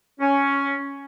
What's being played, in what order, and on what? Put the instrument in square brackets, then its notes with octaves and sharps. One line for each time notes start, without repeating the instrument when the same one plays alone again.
[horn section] C#4